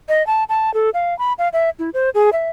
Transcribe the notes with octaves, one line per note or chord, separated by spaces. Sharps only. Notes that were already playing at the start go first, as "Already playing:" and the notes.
D#5
A5
A5
A4
F5
B5
F5
E5
E4
C5
G#4
E5